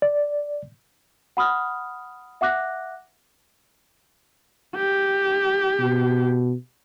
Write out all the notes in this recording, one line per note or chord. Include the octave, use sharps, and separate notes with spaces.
D5
F#5 B5 D#6 F6
E5 F#5 D6 F#6 A#6
G4
B2